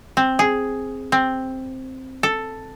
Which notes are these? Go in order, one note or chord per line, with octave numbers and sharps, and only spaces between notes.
C4
G#4
C4
A4